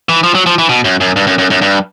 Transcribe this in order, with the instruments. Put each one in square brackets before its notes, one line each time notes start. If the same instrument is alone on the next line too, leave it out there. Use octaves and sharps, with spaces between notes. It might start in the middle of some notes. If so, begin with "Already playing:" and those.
[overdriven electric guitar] E3
F3
F#3
F3
E3
B2
F#2
F#2
G2
F#2
F#2
F#2
G2